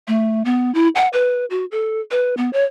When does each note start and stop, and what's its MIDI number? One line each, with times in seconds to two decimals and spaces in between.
0.08 0.43 57
0.45 0.73 59
0.75 0.88 64
0.95 1.08 78
1.13 1.45 71
1.50 1.65 66
1.71 2.00 69
2.11 2.34 71
2.37 2.50 59
2.53 2.64 73